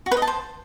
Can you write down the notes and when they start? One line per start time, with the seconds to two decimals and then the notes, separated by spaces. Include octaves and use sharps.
0.06 F#4
0.11 B4
0.17 D#5
0.22 A5
0.27 C5